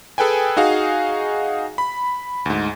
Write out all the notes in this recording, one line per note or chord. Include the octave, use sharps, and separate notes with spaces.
G#4 A4 B4 G5 G#5
D#4 F#4 G#4 F5
B5
D2 G#2